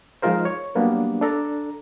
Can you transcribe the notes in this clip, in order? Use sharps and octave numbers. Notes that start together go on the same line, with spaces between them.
F3 G#3 D#4 F4 A#4 C5
C#5
F#3 G3 A#3 B3 D4
D4 A4 A#5